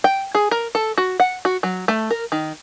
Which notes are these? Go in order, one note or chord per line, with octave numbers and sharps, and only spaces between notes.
G5
G#4
A#4
A4
F#4
F#5
F#4
F#3
A3
A#4
D#3